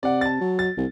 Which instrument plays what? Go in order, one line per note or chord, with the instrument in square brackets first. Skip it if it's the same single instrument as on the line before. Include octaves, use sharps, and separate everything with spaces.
[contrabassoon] C3 [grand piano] D5 F#5
[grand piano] A5 A6
[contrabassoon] F#3
[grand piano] A6
[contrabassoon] C2